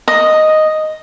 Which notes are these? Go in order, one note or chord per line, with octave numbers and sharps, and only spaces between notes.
D#5